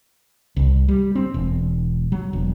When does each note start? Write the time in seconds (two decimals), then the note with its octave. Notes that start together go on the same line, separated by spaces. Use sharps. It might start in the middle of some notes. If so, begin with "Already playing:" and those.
0.57 C2
0.88 G3
1.15 C4
1.34 E1
2.12 F#3
2.33 E1